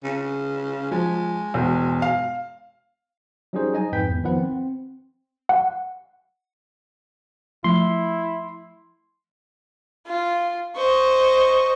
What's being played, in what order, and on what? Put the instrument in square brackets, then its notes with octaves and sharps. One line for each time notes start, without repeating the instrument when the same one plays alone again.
[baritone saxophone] C#3
[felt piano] F3 [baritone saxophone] G#3
[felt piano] E1
F5
[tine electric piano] F#3 G3 C#4 D#4 G#4 C5
D#4 D#5 G#5
F2 G#2 B4 G5 G6 B6
G#1 E2
D#3 F3 B3 B4 F#5
C4
[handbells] F#5
[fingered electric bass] F3 A3 [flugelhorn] E4 [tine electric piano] C6
[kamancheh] F4
[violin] C5 [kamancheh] D#5 C#6